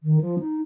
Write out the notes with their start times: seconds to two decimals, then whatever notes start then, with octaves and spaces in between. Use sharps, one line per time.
0.03 D#3
0.21 F3
0.39 D#4